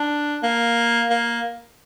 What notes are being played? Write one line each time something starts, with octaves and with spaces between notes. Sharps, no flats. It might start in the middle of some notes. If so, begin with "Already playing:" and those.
Already playing: D4
A#3
A#3